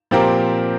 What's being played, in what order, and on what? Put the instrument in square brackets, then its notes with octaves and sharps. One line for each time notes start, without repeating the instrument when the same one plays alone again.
[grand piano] A#2 F3 C4 G4 A#4